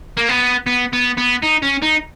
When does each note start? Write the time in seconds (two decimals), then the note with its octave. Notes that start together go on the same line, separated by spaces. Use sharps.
0.17 A#3
0.29 B3
0.67 B3
0.93 B3
1.18 B3
1.43 D#4
1.63 C#4
1.82 D#4